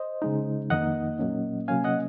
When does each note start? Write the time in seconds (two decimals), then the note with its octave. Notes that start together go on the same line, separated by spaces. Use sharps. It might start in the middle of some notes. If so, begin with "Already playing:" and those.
Already playing: C5 D#5
0.22 C#3 G#3 D#4
0.70 F2 D#3 A#3 D#4 D#5 F#5
1.19 A#2 F#3 A#3 C#4
1.68 C3 F#3 A#3 C#4 F5 G#5
1.84 D#5 F#5